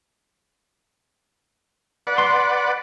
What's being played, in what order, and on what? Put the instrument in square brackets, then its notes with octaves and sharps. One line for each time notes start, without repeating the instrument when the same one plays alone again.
[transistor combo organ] B4 D5 F#5
[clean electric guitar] C6